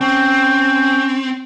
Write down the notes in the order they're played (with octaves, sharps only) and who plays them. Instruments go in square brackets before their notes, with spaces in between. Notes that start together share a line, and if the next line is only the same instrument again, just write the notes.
[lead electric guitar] C4 [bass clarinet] C#4 [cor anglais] G5